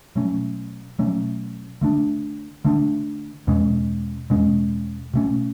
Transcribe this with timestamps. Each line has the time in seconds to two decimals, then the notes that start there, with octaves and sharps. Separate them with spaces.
0.15 B2 F#3 A3 C#4
0.99 B2 F#3 A3 C#4
1.81 D3 A3 D4
2.65 D3 A3 D4
3.47 E2 B2 G#3 C#4
4.30 E2 B2 G#3 C#4
5.14 B2 A3 C#4